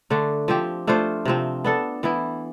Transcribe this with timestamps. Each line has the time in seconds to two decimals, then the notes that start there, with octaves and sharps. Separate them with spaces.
0.10 D3 A3 D4
0.48 F3 C4 G4
0.87 A3 D4 F4 C5
1.25 C3 F3 C4
1.64 B3 D4 A4
2.03 E3 B3 E4